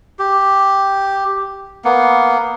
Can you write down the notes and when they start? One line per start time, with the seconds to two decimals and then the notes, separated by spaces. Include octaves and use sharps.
0.19 G4
1.85 A#3 B3